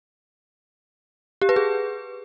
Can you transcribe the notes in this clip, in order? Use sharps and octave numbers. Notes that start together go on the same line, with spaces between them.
G4
B4
G#4